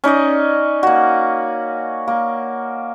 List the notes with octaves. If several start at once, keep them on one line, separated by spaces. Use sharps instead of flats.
C#4 D#4 D5 D#5
A#3 F#4
A#3